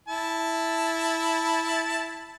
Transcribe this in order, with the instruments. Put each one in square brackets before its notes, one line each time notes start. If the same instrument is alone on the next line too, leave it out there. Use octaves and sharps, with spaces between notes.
[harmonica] E4 A5